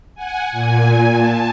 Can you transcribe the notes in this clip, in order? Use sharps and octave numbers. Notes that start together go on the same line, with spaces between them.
F#5 G#5
A#2 G#5
A5